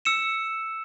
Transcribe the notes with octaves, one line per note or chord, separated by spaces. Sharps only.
E6 C#7 E7